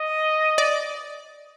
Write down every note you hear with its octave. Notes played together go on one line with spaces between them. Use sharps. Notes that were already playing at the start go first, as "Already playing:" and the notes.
Already playing: D#5
D5